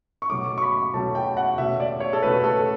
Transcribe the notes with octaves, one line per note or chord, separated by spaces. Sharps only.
C#6
B2 F#3 A3 C#4 D6
C#6
B5
B2 F#3 A3 C#4 A5
G5
F#5
B2 A3 C#4 E5
D5
C#5
A4
B2 A3 C#4 B4
A4